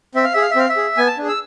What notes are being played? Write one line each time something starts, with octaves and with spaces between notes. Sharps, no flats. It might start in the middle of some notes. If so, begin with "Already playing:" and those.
C4 E5
F5
G#4 E5
F5
E5
C4 F5
E5
G#4
B3 G#5
A5
D4 G#4
E6